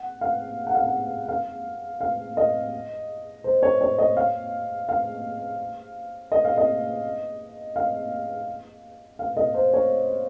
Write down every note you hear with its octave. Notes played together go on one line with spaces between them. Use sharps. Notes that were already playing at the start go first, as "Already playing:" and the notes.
Already playing: F#5
F5
F#5
F5
F#5
F5
F5
D#5
C5
C#5
C#5
D#5
F5
F5
D#5
F5
D#5
F5
F5
D#5
C5
C#5